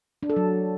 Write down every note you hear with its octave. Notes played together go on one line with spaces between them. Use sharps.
D4
A4
F#3